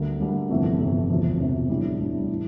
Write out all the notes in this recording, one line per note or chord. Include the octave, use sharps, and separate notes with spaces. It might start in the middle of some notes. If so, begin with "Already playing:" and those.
Already playing: D2 D3 G3 A#3
D2 D3 G3 A#3
G1 F2 C3 E3 A3
G1 F2 C3 E3 A3
E1 D2 C3 F3
E1 D2 C3 F3
A2 G3 D4
A2 G3 D4
E3